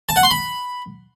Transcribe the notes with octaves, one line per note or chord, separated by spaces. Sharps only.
A5
F#5
C6
B5